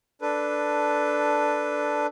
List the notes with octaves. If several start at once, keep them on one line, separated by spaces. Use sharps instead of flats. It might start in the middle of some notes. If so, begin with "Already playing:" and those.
D4 A4 B4